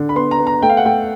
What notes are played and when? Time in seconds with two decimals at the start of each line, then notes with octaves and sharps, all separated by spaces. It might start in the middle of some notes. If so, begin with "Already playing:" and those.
Already playing: D3
0.09 B5
0.16 B3 C6
0.31 A#5
0.39 B3
0.47 A#5
0.63 A3 G5
0.69 F5
0.77 F#5
0.85 A3 G5